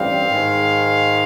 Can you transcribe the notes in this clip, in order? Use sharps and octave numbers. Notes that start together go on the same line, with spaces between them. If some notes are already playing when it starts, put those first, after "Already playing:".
Already playing: A1 G2 E3 G3 C4 F5
G#2 D#3 G#3